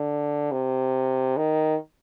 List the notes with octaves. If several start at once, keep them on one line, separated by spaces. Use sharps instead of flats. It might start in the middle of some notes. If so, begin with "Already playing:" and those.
Already playing: D3
C3
D#3